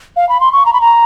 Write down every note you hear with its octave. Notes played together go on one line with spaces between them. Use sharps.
F5
B5
C6
C#6
A#5
B5
A#5